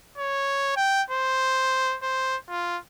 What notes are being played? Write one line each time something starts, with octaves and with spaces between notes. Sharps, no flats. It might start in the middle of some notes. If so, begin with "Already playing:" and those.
C#5
G5
C5
C5
F4